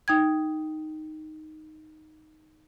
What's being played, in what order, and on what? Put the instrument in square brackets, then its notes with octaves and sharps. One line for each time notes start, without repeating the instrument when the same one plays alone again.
[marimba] D#4 G5 G#6